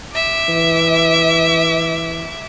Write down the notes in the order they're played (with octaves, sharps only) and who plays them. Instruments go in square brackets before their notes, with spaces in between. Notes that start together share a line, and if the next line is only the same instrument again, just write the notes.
[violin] E5 D6
[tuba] E3